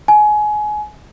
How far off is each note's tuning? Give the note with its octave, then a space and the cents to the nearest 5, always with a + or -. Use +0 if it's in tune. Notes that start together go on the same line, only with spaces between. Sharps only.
G#5 +25